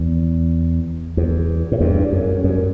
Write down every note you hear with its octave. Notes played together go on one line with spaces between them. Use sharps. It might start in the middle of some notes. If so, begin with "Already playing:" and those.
Already playing: E2
E2
A2
E2 G2
F#2
F#2